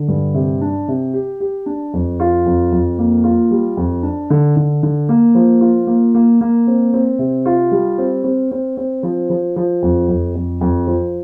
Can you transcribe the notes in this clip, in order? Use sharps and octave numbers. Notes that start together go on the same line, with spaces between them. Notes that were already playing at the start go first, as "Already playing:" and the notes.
Already playing: D3
G2
C3
D4
C3
G4
G4
D4
F2
F4
F2
F2
A#3
F4
G3
F2
D4
D3
D3
D3
A#3
F3
F4
A#3
A#3
A#3
C4
C4
C3
F4
G3
C4
C4
C4
C4
F3
F3
F3
F2
F2
F2
F2
F3